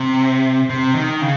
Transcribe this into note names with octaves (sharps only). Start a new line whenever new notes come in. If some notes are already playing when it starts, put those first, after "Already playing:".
Already playing: C3
C3
D#3
C#3